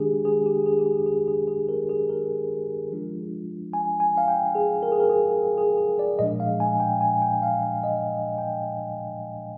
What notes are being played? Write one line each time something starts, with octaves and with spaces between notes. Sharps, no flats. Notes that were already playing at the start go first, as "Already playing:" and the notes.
Already playing: D#3 G#3 D4 G4 G#4
G#4
G4
G#4
G4
G#4
G#4
G#4
G#4
A#4
G#4
A#4
F3 G#3 D4 F4
G#5
G#5
F5
G5
G#4
A#4
G#4
A#4
G#4
G#4
G#4
D5
A#2 F3 G#3 D4 D#5
F5
G#5
G5
G#5
G5
F5
F5
D#5
G5